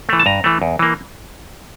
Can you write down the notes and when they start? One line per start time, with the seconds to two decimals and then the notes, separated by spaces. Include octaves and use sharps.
0.09 E3 A3
0.20 A5
0.26 G2 A#5
0.44 E3 A3
0.62 E2
0.79 E3 A#3